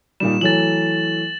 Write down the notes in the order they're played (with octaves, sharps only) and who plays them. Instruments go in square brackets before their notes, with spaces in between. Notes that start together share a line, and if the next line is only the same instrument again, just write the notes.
[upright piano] A#2 D#3 G3 [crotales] E7
[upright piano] E3 F#3 A3 [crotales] A6 F#7